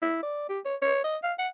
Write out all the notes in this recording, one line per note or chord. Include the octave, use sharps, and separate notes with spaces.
E4
D5
G4
C#5
C#5
D#5
F5
F#5